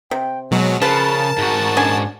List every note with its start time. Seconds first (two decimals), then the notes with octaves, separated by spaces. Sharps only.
0.11 C3 G5
0.51 B2 F#3 G#3
0.82 C#3 F3 A#4 B4 A5
1.38 G#2 F#4
1.77 D3 C#4 G#5